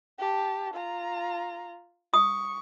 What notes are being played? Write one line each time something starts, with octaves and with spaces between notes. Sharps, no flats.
G4 A5
F4 A#5
C#6 D#6